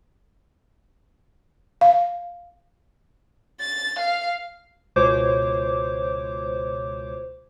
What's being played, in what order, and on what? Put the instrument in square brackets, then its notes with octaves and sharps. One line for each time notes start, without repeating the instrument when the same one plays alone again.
[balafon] F5
[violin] A6
F5
[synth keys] C#2 B2 C5 C#5 D6